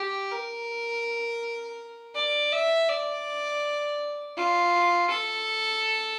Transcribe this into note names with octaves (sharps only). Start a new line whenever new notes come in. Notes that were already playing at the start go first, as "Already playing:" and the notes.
Already playing: G4
A#4
D5
E5
D5
F4
A4